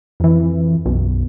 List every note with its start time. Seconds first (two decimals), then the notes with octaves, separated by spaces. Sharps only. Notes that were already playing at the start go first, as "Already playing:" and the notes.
0.20 F2 E3
0.86 B1 F#2